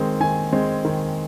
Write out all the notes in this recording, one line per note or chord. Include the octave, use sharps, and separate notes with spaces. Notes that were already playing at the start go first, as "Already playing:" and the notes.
Already playing: D#3 G#3 C4
D#3 G#5
G#3 C4
D#3